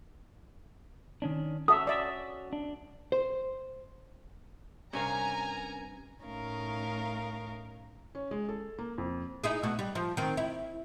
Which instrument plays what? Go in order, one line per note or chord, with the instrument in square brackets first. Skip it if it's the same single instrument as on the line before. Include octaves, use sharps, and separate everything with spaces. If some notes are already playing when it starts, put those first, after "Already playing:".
[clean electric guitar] D#3 C#4 D4
[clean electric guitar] C#4 F#4 [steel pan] A4 E5 [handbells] D#6
[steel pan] D5 E5
[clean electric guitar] D4
[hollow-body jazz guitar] C5
[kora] G2 C3 F5 [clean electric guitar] C#4 A#4 [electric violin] G#5 [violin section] A#5
[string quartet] A2 A3 C#4 D#4 A#4 F5
[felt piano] C#4
G#3
A4
A#3
F2
[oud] D#4 E4 G#4
B2 A3 F#4
G3
F3
D#3 C4
E4